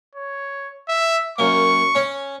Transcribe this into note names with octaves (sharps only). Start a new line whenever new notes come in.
C#5
E5
F#2 A#3 C#6
C#4 C#5